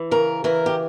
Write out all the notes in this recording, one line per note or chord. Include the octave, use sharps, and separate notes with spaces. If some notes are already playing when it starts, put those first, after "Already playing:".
Already playing: E3
C#3 A#4
E3 A#4
G4